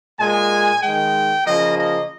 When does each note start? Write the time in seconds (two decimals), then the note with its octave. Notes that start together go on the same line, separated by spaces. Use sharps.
0.19 A#2 G#3 G#5
0.82 D#3 G#3 G5
1.45 C#3 F3 A#3 D#5
1.78 D#5